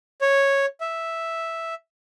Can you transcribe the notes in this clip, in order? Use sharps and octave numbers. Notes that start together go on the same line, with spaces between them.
C#5
E5